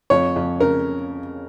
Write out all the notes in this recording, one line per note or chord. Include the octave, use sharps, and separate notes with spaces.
F2 C#5
F2
C#3 A#4